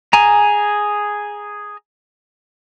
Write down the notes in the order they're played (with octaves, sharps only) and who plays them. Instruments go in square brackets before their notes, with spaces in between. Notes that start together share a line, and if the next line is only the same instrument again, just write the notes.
[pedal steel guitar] G#4 G#5 A#5